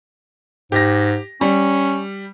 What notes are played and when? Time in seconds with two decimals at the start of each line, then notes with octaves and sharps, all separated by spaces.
0.72 G#2 G4 A#6
1.41 G3 C#4